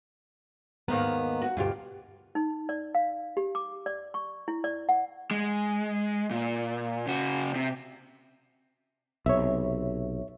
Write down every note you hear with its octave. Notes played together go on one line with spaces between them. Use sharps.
D#2 G#2 D#3 A#3 B3 A#5
F#4
D2 G2 B2 F4 G4
D#4
D5
F5
G4
D6
D5
C#6
E4
D5
F#5
G#3
A#2
C#3 F#4
C3
B1 C3 C#5 E5